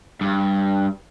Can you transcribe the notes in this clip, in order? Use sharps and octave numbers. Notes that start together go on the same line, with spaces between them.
G2